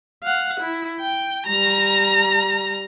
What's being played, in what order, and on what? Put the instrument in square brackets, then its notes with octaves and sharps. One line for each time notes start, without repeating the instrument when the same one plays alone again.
[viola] F5 F#5
E4
G5
G3 A#5